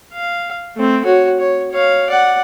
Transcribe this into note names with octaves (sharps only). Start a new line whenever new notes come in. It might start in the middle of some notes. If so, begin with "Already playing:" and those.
F5
A3 C4
F#4 C#5
C#5
C#5 F5
D5 F#5